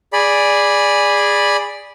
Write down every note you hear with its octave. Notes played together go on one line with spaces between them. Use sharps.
G#4 D5 B5